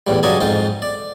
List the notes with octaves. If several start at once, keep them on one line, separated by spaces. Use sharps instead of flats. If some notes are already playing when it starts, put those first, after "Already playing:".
E2 A2 G3
G2 C#3 F#3 D5 D#5 G#5
F2 G#2 F4 G5
D5